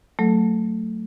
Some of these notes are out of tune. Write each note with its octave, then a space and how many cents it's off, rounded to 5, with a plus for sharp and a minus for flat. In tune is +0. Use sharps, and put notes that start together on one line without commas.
F#3 +0 A3 +15 A4 -10